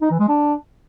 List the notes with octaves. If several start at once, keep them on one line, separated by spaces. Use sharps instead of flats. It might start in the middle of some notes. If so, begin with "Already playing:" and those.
D#4
E3
G#3
D4